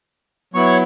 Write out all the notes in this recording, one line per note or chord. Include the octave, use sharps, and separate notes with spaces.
F#3 B3 E4 C#5 C#6